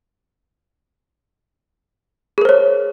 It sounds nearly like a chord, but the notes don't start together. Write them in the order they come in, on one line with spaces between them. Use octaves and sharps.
G#4 A#4 C5 C#5